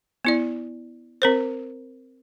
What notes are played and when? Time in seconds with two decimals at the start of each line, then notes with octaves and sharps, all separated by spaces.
0.25 B3 E4 D5
1.22 C4 A#4 C5